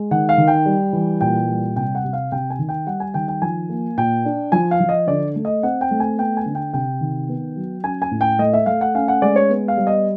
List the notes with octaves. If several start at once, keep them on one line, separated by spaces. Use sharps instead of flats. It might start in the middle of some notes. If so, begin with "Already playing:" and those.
Already playing: G#3
D#3 F#5
F5
D#3
G5
G3
E3
A#2 G5
G3
C3 G5
F#5
C3
F5
C3 G5
G#5
D#3
G5
G3 F#5
G#5
D#3 G5
G5
F3 G#5
A#3
A#2 G5
D4
F3 G#5
F5
F3
D#5
D3 D5
A3
D#5
C4 F#5
G5
A3
G#5
B3 G5
G#5
D3
G5
C3 G5
D#3
B3
F#3
C#4 G#5
G#5
A2
G5
A3 D#5
E5
A3 F5
F#5
C#4 F5
F#5
G#3 D5
C#5
B3
F5
G3
D#5